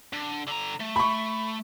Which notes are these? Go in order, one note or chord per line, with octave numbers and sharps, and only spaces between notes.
D3
D3 A#5
A3
B5 C#6